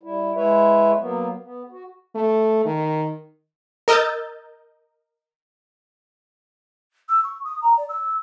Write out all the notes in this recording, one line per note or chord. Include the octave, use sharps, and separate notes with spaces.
G3 E4
G#3 E4 B4 C#5 E5
F#3 A#3 B3
B3
F#4
A3
D#3
A#4 D#5 E6 F6 G6 A6
E6
C#6
D#6
A#5
D5
E6